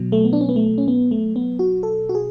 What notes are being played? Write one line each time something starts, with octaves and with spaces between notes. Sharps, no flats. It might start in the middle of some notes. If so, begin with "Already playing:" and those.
Already playing: B2 F#3
A3
B3
D4
C#4
B3
A3
C#4
B3
A3
B3
F#4
A4
F#4
G#4